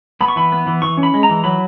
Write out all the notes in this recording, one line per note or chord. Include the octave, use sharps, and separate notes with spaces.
B3 B5
C#6
E3 B5
B3
E3
E3 C#6
C#4
B5
G#3
A#5
E3
F#3 B5